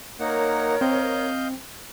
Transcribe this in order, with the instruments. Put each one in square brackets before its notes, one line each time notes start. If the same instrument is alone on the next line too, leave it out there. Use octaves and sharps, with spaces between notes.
[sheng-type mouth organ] A#3 D#4 F#5 [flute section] A#4 C#5
[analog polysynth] C4 [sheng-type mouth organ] D#5 F5 G6